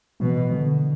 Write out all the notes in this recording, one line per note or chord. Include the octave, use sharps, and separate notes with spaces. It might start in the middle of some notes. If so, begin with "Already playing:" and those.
B2 E3
D3